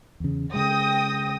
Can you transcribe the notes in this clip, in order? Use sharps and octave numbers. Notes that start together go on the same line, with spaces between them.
E2 C#3
C#3 G#3 G5 D#6 A#6